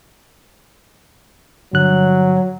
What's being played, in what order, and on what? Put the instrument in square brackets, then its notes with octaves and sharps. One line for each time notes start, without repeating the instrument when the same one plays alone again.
[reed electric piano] G2 D3 F#6 [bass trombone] F#3